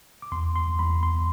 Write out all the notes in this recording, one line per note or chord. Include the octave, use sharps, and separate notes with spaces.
D6
E2 C6
C6
E2 B5
C6